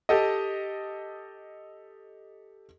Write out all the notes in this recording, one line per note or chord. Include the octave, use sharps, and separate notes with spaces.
G4 A4 D#5